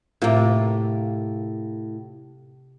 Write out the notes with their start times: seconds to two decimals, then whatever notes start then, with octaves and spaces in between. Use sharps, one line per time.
0.22 A2 C3 A#3 F4